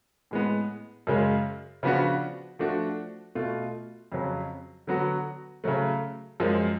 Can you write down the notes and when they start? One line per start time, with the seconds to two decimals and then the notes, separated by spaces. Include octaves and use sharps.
0.31 A2 G#3 B3
1.07 F#2 C#3 G#3
1.83 C#3 F3 B3 D4 F#4
2.59 F3 A3 D4 F#4
3.35 B2 A3 F4
4.12 F2 C#3 F#3
4.87 D3 F#3 B3 F#4
5.64 C#3 F#3 A3
6.40 F#2 F3 G#3